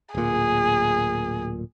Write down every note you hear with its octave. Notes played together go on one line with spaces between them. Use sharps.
D1 A#2 G#4